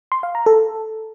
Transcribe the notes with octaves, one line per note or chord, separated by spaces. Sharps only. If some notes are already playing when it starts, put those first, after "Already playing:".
C6
F5
A#5
A4